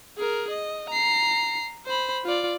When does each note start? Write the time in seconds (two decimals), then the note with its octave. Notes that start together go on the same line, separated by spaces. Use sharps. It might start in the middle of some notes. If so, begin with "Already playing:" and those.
0.17 G#4 A#4
0.50 D#5
0.89 A#5 C7
1.86 C5 B5
2.25 F4 D5